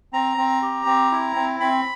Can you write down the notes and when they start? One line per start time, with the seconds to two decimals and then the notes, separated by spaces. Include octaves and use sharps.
0.13 C4 A#5
0.37 C4
0.62 G4
0.86 C4
1.12 E4
1.36 C4
1.60 C4 B5